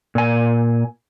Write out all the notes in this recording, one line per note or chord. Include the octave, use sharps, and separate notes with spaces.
A#2 G#5